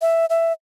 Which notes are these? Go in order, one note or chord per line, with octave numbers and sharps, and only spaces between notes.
E5
E5